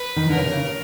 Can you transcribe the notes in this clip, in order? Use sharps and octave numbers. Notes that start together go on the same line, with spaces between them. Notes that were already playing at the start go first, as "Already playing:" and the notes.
Already playing: B4
D#3
D3 A#4
C#3
C3
C#3